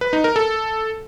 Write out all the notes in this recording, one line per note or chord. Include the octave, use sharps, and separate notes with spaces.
B4
D#4
A#4
A4